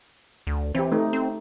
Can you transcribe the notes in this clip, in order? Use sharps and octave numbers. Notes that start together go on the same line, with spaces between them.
D2
E3 C4 G4
A3 D#4
C4